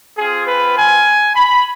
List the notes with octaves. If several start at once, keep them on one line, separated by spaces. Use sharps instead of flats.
C4 F4 G#4
B4
G#5
B5